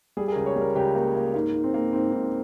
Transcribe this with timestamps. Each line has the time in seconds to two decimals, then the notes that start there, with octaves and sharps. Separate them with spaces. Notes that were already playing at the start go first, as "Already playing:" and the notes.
0.17 G3 G#4
0.28 G#4
0.32 A#4
0.36 C#2
0.46 C#5
0.56 G3
0.61 A#4
0.75 C#2 G4
0.95 A#3
1.15 A#3
1.34 G#2 A#3
1.54 G#2
1.64 C4
1.74 A#3
1.93 G#2 C4
2.12 G#2